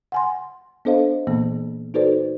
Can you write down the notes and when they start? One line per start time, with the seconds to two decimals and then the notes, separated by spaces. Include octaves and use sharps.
0.12 F#5 G#5 C6
0.85 B3 D4 A4 C5 D#5 F5
1.27 A#2 E3 A#3 B3
1.94 D#4 F#4 A4 B4 C5 D5